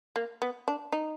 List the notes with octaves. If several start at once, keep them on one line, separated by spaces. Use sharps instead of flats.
A#3
B3
D4
D#4